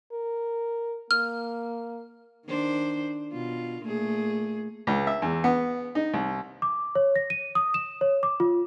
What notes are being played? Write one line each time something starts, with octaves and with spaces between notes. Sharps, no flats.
A#4
A#3 F6
D#3 D4 C5
B2 F4
A#2 A3 G#4
C#2
E5
E2
B3
D#4
C2
D6
C#5
A#6
D#7
D#6
E7
C#5
D6
F4